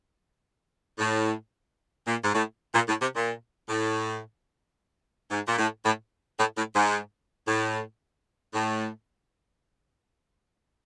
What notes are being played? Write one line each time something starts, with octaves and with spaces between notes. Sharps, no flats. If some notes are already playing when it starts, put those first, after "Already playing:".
A2
A#2
G#2
A2
A#2
A2
C3
A#2
A2
G#2
A#2
A2
A2
A2
A2
G#2
A2
A2